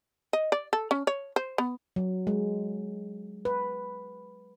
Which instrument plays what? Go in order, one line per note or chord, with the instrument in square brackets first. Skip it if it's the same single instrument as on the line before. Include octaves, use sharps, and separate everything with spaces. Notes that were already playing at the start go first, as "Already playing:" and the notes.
[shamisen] D#5
D5
A4
C#4
C#5
C5
B3
[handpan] F#3
G#3
B4